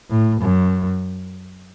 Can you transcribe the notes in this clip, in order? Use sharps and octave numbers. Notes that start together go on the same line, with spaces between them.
A2
F#2